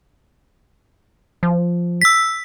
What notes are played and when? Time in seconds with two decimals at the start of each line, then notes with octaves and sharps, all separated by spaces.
1.43 F3
2.01 E6 B6